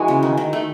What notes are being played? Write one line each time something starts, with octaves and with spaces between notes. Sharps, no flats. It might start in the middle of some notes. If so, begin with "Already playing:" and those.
Already playing: E3 G#3 F#4
C#3
D#3
D#3
A3